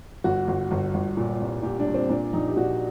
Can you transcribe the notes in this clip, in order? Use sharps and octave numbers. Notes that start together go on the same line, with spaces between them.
G1 F#4
G1
G1
G1
A#2
C2
A#2 G4
D4
A#2
C4
A#2 D4
A#1 D#4
G4
A#2 F#4